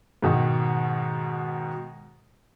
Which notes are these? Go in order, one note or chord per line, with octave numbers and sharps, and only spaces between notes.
G#2 B2 D#3